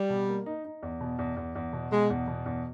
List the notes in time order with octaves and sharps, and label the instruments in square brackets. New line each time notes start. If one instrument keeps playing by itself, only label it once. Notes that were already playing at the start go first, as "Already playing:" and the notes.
Already playing: [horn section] G3
[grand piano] B2
A#3
D#4
D#4
E2
B2
E2
E2
E2
B2
[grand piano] B2 [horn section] G#3
[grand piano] E2
B2
E2